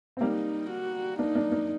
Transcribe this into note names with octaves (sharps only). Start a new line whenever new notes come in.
C4
G3 A#3 D#4
F#4
A#3 D4 D#4
A#3 D4
A#3 D4